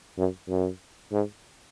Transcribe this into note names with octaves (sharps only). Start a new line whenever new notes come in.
F#2
F#2
G#2